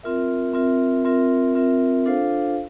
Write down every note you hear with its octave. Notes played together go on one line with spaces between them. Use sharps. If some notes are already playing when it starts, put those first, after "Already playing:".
C4 F4 A#4 E5
C4 F4 A#4 E5
C4 F4 A#4 E5
C4 F4 A#4 E5
D4 F4 A4 C5 F5